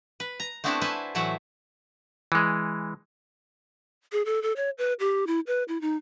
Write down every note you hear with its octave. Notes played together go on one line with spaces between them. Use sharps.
B4
A#5
A3 B3 C4 D4 E4 F#4
B4 C5 E5 G#5 A5
A2 E3 F#3 A3 E5 F#5
E3 G#3
G#4
A4
A4
C#5
B4
G4
E4
B4
E4
D#4